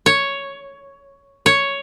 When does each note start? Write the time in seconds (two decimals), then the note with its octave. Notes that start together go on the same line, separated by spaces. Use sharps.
0.06 C#5
1.46 C#5